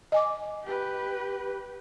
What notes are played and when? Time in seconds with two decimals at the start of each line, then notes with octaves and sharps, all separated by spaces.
0.12 D#5 G#5 D6
0.64 G4 B4